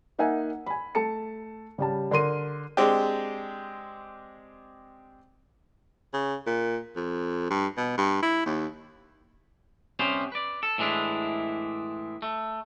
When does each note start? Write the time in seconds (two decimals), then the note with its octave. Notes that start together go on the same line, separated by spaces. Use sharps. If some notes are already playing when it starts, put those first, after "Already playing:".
0.19 A#3 D#4 E5 F#5 G#5
0.66 G#5 B5
0.95 A3 A5 C#7
1.78 C#3 G3 A5
2.11 D3 A#4 C6 D#7
2.77 G#3 C4 D4 G4
6.13 C#3
6.47 A#2
6.96 F2
7.50 G2
7.77 B2
7.97 G2
8.22 E4
8.46 D#2
9.99 C3 G3 B3 C#4 C5
10.32 B4 D5
10.63 A4
10.78 A2 E3 G#3 D4 E4
12.22 A3